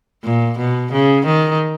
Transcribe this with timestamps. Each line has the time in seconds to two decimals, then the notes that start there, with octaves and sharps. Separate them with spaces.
0.24 A#2
0.59 B2
0.92 C#3
1.26 D#3